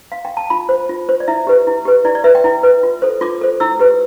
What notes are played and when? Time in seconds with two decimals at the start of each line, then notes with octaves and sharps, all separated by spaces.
0.12 F5
0.25 G5
0.37 A5
0.50 F4 B5
0.69 C5
0.89 F4
1.09 C5
1.20 D5
1.28 E4 E5
1.47 G4 B4
1.67 E4
1.85 G4 B4
2.05 E4 D5
2.15 D5
2.24 B4 E5
2.35 G5
2.44 E4
2.63 B4
2.83 F4
3.02 A4 C5
3.21 F4 D6
3.41 A4 C5
3.60 E4 E6
3.79 G4 B4